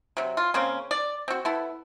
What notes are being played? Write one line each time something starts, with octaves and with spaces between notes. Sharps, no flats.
C3 F#3
F4
C#3 A#3 C4 C#4
D5
C4 F#4
B3 E4 A4